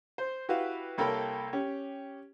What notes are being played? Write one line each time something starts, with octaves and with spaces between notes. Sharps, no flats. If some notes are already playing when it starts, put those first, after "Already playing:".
C5
E4 F#4 G4 B4 F5
C2 A#3 A4 C#5 G5 B5
C#4 G4